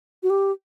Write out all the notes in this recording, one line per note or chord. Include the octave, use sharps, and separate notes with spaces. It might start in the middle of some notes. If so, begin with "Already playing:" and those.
F#4
G4